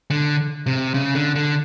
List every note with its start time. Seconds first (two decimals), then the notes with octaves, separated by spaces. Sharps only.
0.10 D3
0.66 C3
0.94 C#3
1.15 D3
1.36 D3